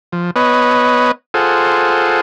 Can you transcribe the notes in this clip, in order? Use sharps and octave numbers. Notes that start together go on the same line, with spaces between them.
F3
B3 B4 C#5 D#5
F4 G#4 A4 C5 F#5